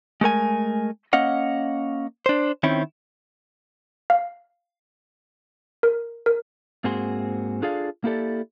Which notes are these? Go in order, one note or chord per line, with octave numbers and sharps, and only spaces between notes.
G#3 A3 A#4 G#5
A#3 C#4 D#5 F5 F#5
D4 C5
D#3 C4 C#4 E4
F5
A#4
A#4
G#2 A#3 C4 F#4 G#4 C6
D4 F4 G#4 A4 D5 F5
A#3 E4 G4 A4 D5